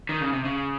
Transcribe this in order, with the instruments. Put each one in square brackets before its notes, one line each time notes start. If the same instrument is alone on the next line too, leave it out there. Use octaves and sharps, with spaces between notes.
[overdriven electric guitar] D#3
C#3
C3
C#3